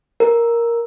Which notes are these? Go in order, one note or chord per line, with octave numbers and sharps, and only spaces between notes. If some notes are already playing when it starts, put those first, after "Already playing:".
A#4